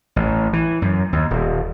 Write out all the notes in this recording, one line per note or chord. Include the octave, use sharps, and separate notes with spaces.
A1
E3
F#2
D#2
D#1